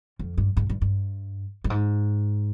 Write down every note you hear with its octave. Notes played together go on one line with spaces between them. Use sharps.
F2
G2
G#2
G2
G2
G2
G#2